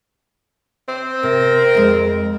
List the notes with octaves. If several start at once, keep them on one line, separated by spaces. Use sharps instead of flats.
C4
C3 A#4
F2 G#3